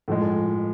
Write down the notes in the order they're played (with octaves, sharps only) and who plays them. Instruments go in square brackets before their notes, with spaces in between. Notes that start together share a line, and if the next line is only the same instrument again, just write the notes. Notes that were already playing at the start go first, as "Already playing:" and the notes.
[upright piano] A2 F3 G#3